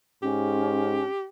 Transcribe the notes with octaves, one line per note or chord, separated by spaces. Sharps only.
G#2 C#4 G4